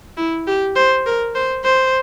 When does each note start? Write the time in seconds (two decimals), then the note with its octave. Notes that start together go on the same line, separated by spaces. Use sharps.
0.17 E4
0.47 G4
0.76 C5
1.06 A#4
1.35 C5
1.64 C5